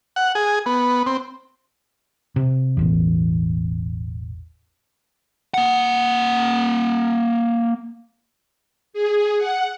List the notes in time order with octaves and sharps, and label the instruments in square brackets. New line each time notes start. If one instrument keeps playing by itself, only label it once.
[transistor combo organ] F#5
G#4
B3
C4
[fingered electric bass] C3
E1 A1 E2
[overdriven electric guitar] A#3 F#5
[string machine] G#4
F#5